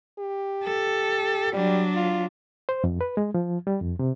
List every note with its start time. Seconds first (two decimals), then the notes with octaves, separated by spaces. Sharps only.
0.19 G4
0.65 A4
1.54 F#3 G3 D4
1.96 F4
2.69 C5
2.84 F2
3.01 B4
3.17 G#3
3.34 F3
3.67 G3
3.80 F2
3.99 C3